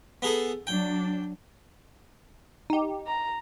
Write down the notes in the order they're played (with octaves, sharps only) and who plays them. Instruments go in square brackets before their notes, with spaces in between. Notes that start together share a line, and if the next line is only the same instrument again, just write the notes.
[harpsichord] B3 G#4 A4
[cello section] F#3 D4 [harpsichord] G5
[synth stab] D#4 G4
[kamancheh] A#5